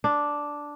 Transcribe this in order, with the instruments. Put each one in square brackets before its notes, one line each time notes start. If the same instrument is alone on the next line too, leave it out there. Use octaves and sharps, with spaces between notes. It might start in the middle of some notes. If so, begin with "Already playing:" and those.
[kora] D4